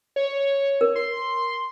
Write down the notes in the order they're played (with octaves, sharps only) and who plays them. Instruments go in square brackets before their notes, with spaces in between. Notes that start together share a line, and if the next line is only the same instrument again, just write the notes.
[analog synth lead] C#5
[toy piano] A#4
[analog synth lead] C6